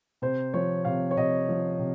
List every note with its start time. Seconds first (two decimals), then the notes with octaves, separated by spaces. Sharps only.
0.22 C3 C5
0.54 F3 C#5
0.85 C3 F5
1.11 C#5
1.17 C3 D#5
1.49 F3
1.79 C3